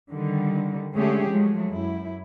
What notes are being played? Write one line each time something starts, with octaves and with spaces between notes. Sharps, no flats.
D3 D#3 G3
D3 G#3 A3 C#4 G4 G#4
F3 F#3 G#3 A3
F#2 E4